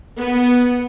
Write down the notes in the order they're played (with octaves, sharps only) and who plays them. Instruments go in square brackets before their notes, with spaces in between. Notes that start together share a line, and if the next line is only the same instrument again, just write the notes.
[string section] B3